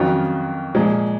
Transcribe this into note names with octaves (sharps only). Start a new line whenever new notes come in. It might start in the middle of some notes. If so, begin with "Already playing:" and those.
Already playing: F2 D#3 F#3 C#4 F4
A#2 F3 G#3